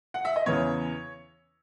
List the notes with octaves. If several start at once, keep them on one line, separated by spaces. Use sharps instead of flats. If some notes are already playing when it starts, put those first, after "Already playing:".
F#5
E5
D#5
E2 C#3 E3 B3 C#5